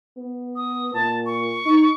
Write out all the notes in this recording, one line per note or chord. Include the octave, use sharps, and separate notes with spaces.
B3
D#6
A#2 A5
C#6
D#4